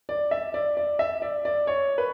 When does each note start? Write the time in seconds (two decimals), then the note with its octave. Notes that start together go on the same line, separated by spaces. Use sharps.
0.09 D5
0.31 E5
0.54 D5
0.77 D5
0.99 E5
1.22 D5
1.45 D5
1.67 C#5
1.98 B4